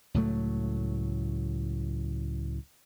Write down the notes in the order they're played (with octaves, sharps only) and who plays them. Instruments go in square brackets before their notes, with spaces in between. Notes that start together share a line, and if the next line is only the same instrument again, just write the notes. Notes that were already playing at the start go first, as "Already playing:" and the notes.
[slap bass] C#2 A2 F#3 A3